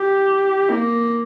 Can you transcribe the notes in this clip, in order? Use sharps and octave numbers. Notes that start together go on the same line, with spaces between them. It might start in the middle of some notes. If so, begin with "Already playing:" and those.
Already playing: G4
A#3